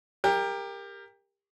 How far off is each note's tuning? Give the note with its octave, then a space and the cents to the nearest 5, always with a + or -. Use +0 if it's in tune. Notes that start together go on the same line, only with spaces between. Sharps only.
G4 +25 A#4 +0